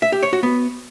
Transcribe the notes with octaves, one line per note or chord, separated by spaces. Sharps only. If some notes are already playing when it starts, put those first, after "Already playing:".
E5
G4
C#5
F#4
B3